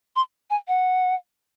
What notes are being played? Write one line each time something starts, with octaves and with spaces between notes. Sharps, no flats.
C6
G#5
F#5